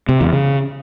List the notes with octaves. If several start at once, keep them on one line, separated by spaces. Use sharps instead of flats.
C3
E2
C#3